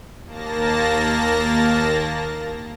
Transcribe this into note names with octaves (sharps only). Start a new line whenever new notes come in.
D#2 A#3 A5 A#6